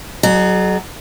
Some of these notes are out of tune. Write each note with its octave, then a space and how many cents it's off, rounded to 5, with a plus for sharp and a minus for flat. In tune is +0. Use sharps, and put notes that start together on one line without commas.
F#3 +15 G#4 +45 D#5 -35